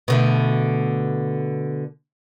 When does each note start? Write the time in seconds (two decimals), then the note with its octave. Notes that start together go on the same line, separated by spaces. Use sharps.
0.08 B2 D3 A3